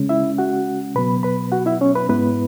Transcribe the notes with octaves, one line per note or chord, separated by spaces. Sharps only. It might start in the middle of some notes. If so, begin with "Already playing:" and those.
Already playing: C#3 G#3 C#4
E4 E5
F#4 F#5
B2 F#3 B3 B4 B5
B4 B5
F#4 F#5
E4 E5
C#4 C#5
B4 B5
G#2 G#3 B3 E4 B4